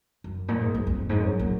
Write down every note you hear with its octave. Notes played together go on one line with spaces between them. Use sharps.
F#2
A#2
G#2
F#2
F2
G#2
F#2
A#2